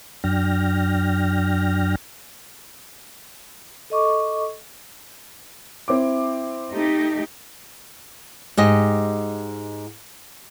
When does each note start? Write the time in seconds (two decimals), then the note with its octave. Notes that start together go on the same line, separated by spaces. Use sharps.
0.24 F#2 F#3 D4 G5 F6 A#6
3.90 A4 D#5 C#6 D6
5.88 C4 E4 D6
6.73 A3 D#4 G4
8.57 G#2 G4 D#5